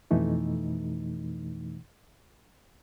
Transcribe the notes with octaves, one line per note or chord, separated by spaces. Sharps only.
F2 B2 E3 A3 D#4